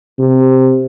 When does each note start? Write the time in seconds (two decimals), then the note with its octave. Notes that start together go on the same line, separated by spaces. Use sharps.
0.19 C3